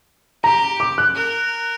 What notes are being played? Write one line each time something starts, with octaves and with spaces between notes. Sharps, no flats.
G4 A#5
D6
F#6
A#4